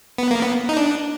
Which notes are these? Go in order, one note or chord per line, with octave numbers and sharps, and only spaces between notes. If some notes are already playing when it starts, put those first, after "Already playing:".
B3
A#3
B3
D#4
D4